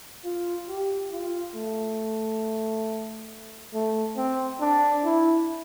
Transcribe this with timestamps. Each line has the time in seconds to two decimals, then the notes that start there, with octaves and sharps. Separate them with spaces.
0.24 F4
0.68 G4
1.12 F4
1.55 A3
3.74 A3
4.17 C4
4.61 D4
5.05 E4